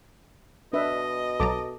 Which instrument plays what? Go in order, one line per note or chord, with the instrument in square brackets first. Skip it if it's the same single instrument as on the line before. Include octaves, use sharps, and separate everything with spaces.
[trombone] B2 [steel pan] D4 B4 E5 [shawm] D#5
[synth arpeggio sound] B1 F#3 A#5 [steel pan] A4 A5 D6